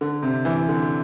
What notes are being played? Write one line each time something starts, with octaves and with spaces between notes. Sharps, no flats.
D3
C3
E3
D3